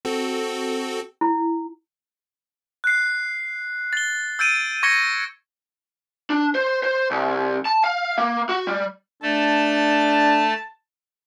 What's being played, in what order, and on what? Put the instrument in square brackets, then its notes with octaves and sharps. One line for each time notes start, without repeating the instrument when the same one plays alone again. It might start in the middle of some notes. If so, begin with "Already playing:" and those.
[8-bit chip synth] C4 F#4 A4
[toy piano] E4
[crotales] F#6 C7
A6 G7
E6 G6 A6 D7 D#7
C#6 G#6 A#6 C#7 G7
[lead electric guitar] D4
C5
C5
C2
A5
F5
A#3
F#4
G3
[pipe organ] A3 A4 [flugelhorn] D4 [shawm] A5